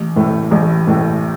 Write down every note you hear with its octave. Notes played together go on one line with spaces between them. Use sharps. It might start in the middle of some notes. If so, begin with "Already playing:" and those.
Already playing: A1
A2 A3
A1
A2 A3